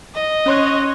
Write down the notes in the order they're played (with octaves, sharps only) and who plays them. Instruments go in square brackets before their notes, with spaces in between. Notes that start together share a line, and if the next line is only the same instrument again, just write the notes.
[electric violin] D#5
[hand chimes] C#4 C6 F#6 [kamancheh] C#5